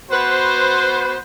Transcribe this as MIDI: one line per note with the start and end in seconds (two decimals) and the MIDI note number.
0.11 1.17 59
0.11 1.17 66
0.11 1.17 71
0.11 1.17 72